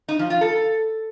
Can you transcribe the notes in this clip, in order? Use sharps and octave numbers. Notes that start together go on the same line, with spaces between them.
D#4
F3
F4
A4